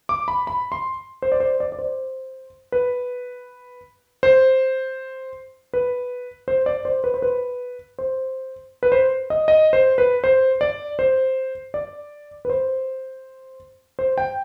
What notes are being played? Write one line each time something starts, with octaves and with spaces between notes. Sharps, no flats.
D6
B5
B5
C6
C5
D5
C5
D5
D5
C5
B4
C5
B4
C5
D5
C5
B4
C5
B4
C5
B4
C5
D#5
D#5
C5
B4
C5
D5
C5
D5
B4
C5
C5
G5